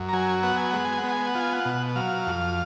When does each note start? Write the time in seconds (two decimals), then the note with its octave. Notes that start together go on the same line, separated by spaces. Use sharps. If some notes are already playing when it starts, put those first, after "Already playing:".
Already playing: F#2
0.09 A#5
0.13 F#3 G#5
0.43 B3 F#5
0.57 G#5
0.71 G#3 F#5
0.85 G#5
0.98 F#5
1.04 B3
1.12 G#5
1.26 F#5
1.35 F4 G#5
1.53 F#5
1.65 B2
1.96 F#3 F5
2.27 F2